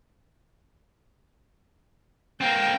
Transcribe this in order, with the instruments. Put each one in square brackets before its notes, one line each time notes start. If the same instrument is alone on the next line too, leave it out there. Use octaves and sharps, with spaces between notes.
[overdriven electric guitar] A#3 C4 [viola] G5